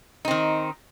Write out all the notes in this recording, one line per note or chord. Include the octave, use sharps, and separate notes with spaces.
D#3 C4 D#4